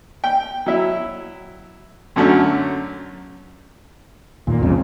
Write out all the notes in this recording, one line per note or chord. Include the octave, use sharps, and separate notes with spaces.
G5
F#3 E4
F#2 D3 F#3 A3 C#4
D#2 A#2 A#3
C2 F2 G#2 C#3